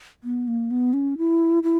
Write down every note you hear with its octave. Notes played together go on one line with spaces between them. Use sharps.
B3
A#3
B3
C#4
E4
E4